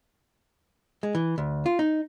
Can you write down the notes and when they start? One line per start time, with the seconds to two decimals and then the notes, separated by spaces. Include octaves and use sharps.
1.03 G#3
1.15 E3
1.38 D2
1.66 F4
1.79 D#4